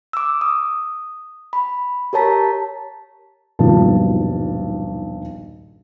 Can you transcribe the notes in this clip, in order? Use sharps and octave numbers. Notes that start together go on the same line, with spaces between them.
D6 E6
D#6
B5
G4 A#4 C#5 A5 A#5 B6
D#1 B1 G2 F3 A5